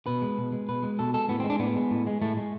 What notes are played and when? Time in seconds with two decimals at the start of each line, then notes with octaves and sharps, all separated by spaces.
0.06 B2 B4
0.22 G#3
0.38 B2
0.52 G#3
0.69 B2 B4
0.83 G#3
0.99 B2 A4
1.14 G#3 A4
1.29 A2 B3
1.40 C4
1.44 G#3
1.50 D4
1.59 A2 B3
1.76 G#3
1.91 A2
2.07 G#3
2.21 A2 A3
2.37 G#3